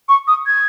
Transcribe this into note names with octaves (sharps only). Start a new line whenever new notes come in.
C#6
D#6
G#6